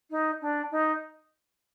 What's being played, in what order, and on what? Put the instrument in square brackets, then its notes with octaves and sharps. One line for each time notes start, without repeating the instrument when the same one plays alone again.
[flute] D#4
D4
D#4